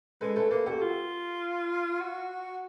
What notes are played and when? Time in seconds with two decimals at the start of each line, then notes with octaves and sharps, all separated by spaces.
0.21 G#3 A4 B4
0.36 A3 A4 B4
0.51 A#3 A4 B4
0.66 F#4 G4 A4
0.81 F4
2.00 F#4